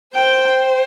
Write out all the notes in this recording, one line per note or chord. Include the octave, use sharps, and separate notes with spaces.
C5 G5